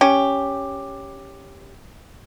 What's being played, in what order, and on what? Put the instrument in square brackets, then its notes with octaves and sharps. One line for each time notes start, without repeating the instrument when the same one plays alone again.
[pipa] C#4 G4